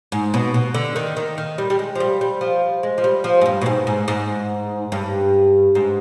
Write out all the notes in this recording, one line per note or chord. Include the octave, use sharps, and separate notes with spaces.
G#2
B2
B2
D3
D#3
D#3
D#3
G3
G3
G#3
F3
G3
G3
F3
G#3
F3
G3
F3
G#2
G2
B2
G#2
G#2
G#2
G2
G#2